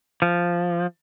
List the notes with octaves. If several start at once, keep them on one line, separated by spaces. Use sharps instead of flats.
F3